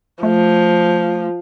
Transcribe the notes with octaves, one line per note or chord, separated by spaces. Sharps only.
F3 A3